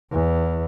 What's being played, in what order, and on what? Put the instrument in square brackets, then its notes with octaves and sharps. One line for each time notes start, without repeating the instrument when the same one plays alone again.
[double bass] E2